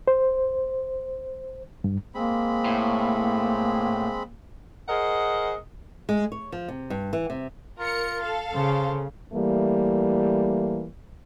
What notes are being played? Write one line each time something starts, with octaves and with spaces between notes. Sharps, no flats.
C5
G2
G#3 A#3 C4 B5
A2
G#4 A#4 C5 D#5 F#5
G#3
C#5
F3
C3
G2
E3
C3
F4 A#4 C#7
A4 F5
C#3 C5
E3 G3 A3 A#3